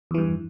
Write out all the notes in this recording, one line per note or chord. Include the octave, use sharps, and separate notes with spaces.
E2 G2 E3